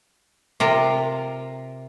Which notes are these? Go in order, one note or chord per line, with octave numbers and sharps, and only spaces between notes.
C3 F4 A#4